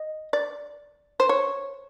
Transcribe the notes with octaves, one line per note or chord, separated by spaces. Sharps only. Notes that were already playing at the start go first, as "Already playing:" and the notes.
Already playing: D#5
D5
C5
C#5